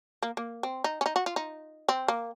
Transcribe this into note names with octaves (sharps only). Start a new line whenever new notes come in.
A#3
A#3
C4
D#4
C#4
D#4
F#4
F4
D#4
C4
A#3